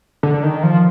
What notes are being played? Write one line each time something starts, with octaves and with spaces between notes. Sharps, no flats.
D3
D#3
F3